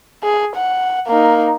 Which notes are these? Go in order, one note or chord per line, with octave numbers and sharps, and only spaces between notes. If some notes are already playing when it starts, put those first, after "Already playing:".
G#4
F#5
A#3 D#4